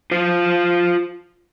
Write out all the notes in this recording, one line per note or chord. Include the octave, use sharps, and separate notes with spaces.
F4 C5